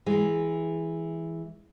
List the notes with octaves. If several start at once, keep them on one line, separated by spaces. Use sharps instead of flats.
E3 G#3